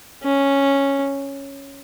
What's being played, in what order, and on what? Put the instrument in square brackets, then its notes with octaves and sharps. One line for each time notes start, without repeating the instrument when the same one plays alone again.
[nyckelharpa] C#4